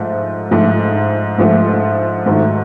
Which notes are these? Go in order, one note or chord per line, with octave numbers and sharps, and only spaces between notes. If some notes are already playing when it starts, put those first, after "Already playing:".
Already playing: G#2 F3 A3
G#2 F3 A3
G#2 F3 A3
G#2 D#3 F#3 A3